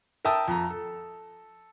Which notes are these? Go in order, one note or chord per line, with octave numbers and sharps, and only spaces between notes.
A#4 E5 G5 A5 D#6 E6
F2 A#5
A4